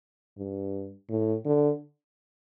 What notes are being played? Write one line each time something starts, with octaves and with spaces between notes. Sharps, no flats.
G2
A2
D3